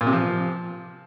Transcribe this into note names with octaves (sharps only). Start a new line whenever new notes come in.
A#2
C3
F3